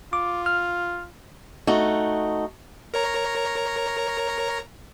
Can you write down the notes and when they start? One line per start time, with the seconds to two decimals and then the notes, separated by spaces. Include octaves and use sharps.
0.13 F4 D6
0.46 F6
1.67 A3 D#4 F#4
2.94 A#4 C#5 A#5